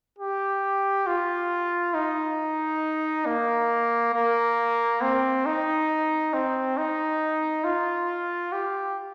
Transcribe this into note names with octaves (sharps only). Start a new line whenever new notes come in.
G4
F4
D#4
A#3
A#3
C4
D#4
C4
D#4
F4
G4